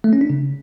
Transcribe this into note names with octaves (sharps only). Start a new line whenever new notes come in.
A3
C#4
D4
C#3